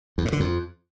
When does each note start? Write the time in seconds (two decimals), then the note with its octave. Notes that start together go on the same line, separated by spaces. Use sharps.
0.18 E2
0.25 A2
0.33 D3
0.40 F2